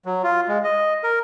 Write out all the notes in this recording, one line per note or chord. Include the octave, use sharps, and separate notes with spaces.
F#3
F4
G#3
D#5
A#4